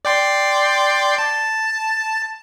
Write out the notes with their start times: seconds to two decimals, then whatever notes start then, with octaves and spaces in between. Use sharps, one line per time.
0.05 D5 G5 C6
1.18 A5